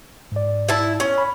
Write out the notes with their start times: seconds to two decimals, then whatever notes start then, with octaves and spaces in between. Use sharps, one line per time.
0.32 G#2 D5
0.68 E4 A5
1.00 C#4
1.18 B5